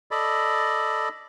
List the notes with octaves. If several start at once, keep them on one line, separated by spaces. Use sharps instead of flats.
A4 D5 D#5 B5